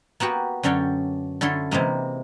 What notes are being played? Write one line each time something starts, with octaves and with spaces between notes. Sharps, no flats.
A#3 B3 F#4 G4
F#2 D3 C#4 D4 G5
D3 C#4 E4 A4 C6
C3 E3 G#3 A#3